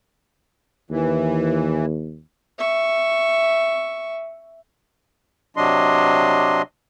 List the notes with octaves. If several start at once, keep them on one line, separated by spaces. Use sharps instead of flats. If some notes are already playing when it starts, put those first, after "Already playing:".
D#2 E3
E5 C#6
C3 F#3 D4 D#5 C6